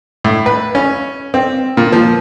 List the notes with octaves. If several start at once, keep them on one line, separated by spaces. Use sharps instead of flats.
A2
B4
C#4
C4
A#2
F3